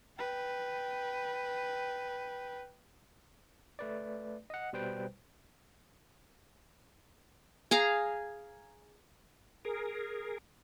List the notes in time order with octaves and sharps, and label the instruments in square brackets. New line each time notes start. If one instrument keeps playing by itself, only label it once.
[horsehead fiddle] B4 G5
[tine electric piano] A3 B4 D5
D#5 F#5
B2 G3 B4 C5 G5
[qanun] G#4 F5 A#5
[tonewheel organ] G#4 A#4